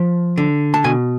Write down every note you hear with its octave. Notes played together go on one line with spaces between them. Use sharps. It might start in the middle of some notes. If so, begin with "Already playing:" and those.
Already playing: F3
D3
A5
B2 G#5